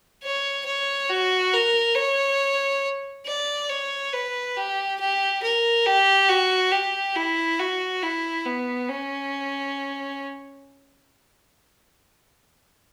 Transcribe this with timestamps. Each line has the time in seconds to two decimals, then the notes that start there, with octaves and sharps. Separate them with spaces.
0.24 C#5
0.66 C#5
1.09 F#4
1.53 A#4
1.96 C#5
3.26 D5
3.69 C#5
4.13 B4
4.57 G4
5.00 G4
5.43 A#4
5.86 G4
6.29 F#4
6.72 G4
7.16 E4
7.60 F#4
8.03 E4
8.46 B3
8.89 C#4